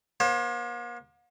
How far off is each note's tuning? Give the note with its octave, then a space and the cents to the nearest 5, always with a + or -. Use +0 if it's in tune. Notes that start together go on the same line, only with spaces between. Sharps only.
A#3 +45 C5 +35